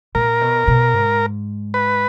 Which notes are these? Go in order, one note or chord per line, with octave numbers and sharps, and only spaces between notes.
A#2 A#4
B2
B2
G#2
B4